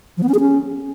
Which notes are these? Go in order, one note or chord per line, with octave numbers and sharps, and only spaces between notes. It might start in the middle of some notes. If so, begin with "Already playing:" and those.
F3
B3
C#4
G#4
C#4